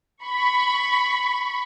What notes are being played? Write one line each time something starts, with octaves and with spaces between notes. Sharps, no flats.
B5 C#6